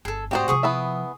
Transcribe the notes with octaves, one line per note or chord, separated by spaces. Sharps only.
G1 G#4 A4
G#2 A3 C4 F#4 G4 C5 D5 D#5
C3 F3 G#4 C#6 D#6
B3 E4 E5